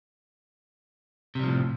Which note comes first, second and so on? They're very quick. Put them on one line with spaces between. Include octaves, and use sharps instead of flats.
C3 G3 F3 A2